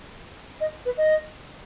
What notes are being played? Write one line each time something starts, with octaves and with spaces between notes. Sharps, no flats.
D#5
B4
D#5